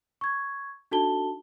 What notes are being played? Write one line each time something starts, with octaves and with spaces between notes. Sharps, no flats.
C#6 G#6
D4 D#4 F#4 A4 A5 G7